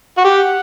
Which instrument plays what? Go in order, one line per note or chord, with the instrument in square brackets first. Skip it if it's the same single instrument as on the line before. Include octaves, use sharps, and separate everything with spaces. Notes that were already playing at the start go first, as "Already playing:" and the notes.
[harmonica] F#4
[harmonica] G4 [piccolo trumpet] F#5